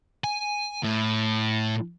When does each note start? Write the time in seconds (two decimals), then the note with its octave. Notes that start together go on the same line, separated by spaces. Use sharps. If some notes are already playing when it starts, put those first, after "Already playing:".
0.24 G#5
0.83 A2